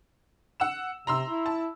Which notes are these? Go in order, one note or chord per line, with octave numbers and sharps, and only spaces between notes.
F#5 E6 E7
C3 A#5 C6 E6
E4
A5